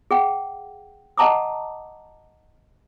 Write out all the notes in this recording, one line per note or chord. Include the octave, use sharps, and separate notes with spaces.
G#4 F#5 G5
D#5 F#5 A5 A#5 D6 D#6